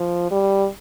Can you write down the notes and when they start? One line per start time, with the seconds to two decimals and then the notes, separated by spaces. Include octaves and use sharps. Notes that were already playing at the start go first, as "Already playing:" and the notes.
Already playing: F3
0.31 G3